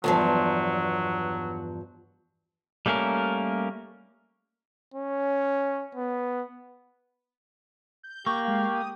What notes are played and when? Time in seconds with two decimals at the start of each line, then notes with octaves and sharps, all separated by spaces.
0.04 E2 G2 F3 F#3
2.86 G3 A3 A#3 C#4 A#4
4.94 C#4
5.95 B3
8.03 G6
8.26 A#3 G4 C#6
8.45 G#3 F5
8.74 D#6